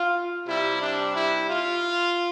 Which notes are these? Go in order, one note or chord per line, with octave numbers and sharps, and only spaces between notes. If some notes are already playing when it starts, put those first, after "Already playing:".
Already playing: F4
C3 G3 E4
D4
E4
F4